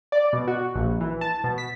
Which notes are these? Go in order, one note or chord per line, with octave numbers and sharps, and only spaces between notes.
D5
B2
F#4
A#1
E3
A5
B2
B6